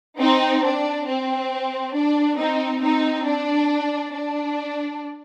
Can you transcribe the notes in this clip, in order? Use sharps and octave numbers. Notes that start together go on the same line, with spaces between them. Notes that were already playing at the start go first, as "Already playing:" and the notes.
C4 D#4
D4
C4
D4
C4 D#4
C4 D#4
D4
D4